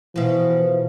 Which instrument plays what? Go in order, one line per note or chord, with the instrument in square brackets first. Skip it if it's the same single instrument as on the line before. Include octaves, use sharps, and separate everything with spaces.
[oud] B2 F3 [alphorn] E3